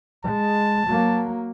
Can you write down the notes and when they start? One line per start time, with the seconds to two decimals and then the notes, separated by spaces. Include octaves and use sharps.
0.25 G#3 A5
0.86 F#3 A#3